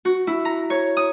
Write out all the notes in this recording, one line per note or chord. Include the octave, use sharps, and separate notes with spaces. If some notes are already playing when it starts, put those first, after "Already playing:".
F#4
E4
A#5
C#5
D#6